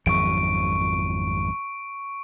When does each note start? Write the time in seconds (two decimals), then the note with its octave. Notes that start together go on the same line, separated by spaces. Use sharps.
0.06 G#1 F2 F#3 C#6 D7